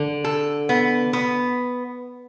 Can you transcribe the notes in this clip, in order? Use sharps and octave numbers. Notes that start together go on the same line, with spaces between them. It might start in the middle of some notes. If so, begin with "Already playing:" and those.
Already playing: D3
A4
B3
B3